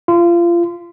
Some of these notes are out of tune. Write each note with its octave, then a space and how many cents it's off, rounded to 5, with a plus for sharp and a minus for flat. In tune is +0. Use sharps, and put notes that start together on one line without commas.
F4 -25